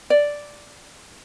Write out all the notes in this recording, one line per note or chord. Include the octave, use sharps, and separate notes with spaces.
D5